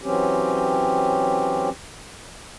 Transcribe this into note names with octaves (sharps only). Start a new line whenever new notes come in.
E3 F#3 C4 C#4 G4